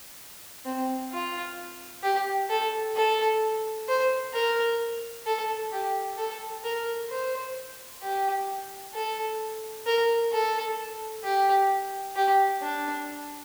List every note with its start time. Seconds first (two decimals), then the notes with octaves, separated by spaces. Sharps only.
0.65 C4
1.12 F4
2.03 G4
2.50 A4
2.96 A4
3.88 C5
4.33 A#4
5.26 A4
5.72 G4
6.18 A4
6.64 A#4
7.10 C5
8.02 G4
8.93 A4
9.86 A#4
10.32 A4
11.24 G4
12.16 G4
12.62 D4